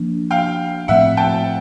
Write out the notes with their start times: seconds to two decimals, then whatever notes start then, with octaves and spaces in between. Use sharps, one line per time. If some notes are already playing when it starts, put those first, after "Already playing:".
Already playing: F3 A#3 D4
0.31 F5 G5
0.88 A2 F3 A3 C4 E5 F#5
1.17 G5 A5